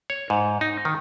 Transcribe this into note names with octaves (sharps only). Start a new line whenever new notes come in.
C#5
G#2
D#4
D#3